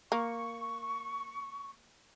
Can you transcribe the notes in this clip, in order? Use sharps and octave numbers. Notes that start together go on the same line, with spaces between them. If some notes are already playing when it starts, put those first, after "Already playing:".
A#3 C#6